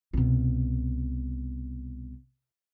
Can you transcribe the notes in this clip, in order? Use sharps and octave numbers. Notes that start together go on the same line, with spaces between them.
C2 B2